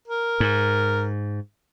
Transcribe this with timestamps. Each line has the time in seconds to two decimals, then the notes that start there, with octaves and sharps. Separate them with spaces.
0.08 A#4
0.40 G#2